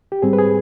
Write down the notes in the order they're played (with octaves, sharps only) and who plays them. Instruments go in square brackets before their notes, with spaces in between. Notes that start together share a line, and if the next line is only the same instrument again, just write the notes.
[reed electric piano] G4
G#2 G3 C4 G#4
B4
G#4